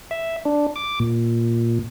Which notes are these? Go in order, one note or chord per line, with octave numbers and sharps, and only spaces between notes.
E5
D4
D6
A#2